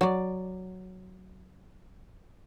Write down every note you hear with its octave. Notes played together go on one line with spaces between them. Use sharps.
F#3 D5